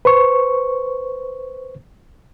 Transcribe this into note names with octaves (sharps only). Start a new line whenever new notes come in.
B4 C5 C#6